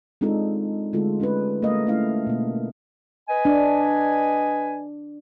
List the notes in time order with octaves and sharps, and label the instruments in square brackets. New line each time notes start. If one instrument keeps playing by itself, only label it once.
[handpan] G#3 C4 D4 D#4 F4 A4
D3 G#3 A3 F4 F#4 A4
C#4 D4 G#4 B4
A3 A#3 A#4 D#5 F5
A3 C#4 E4 F5
B2 A#3
[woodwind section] B4 D#5 G#5
[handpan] D4